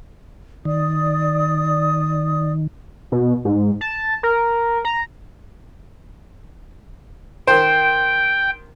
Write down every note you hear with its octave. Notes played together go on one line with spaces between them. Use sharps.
D#3 D5 D#6
B2
G#2
A5
A#4
A#5
D#3 C5 G5